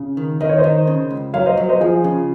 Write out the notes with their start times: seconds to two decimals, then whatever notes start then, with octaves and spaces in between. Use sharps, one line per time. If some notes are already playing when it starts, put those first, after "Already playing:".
Already playing: C#3
0.17 D#3
0.41 D#3 D#5
0.49 C#5
0.58 C5 D#5
0.64 D#3
0.87 C#3
1.11 C#2
1.34 F#3 C#5 F5
1.46 C5 D#5
1.57 F#3
1.69 C5 D#5
1.80 F3 F4 G#4
2.04 C#3